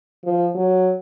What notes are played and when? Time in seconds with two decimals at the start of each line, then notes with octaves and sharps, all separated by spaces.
0.25 F3
0.55 F#3